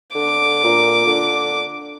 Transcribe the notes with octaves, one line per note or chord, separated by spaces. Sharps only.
D3 D6
A#2
D3